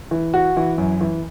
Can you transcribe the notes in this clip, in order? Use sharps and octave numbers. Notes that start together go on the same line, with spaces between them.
E3
F#4
E3
F#2
E3